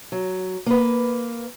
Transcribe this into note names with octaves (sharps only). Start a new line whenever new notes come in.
F#3
A#3 B4